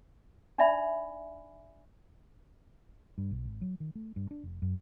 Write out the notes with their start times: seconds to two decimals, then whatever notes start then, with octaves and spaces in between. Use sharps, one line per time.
0.58 D4 D#4 D5 E5 G#5 B5
3.18 G2
3.31 B1
3.45 G#1
3.61 F#3
3.80 D#3
3.95 A3
4.16 G2
4.31 D4
4.43 F1
4.62 F#2